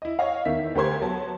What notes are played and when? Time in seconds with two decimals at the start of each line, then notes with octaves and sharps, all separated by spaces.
0.02 E4 D#5
0.19 C#5 D#5 F5
0.45 E2 D#3 E5 B6
0.75 D2 G4 A#4 C5 C6 G#6
1.02 F#3 B3 B4 A5